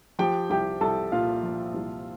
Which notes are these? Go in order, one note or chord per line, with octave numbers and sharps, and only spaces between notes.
F3 G4 G5
C2 G4 G5
C2 A4 A5
A#2 F4 F5
F3
C2